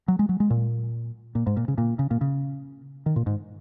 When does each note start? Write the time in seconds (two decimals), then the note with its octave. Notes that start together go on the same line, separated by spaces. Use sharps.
0.08 F#3
0.19 G#3
0.29 F#3
0.40 G#3
0.50 A#2
1.35 A#2
1.47 G#2
1.57 A#2
1.68 C#3
1.78 A#2
1.99 C#3
2.11 A#2
2.21 C#3
3.06 D#3
3.16 A#2
3.26 G#2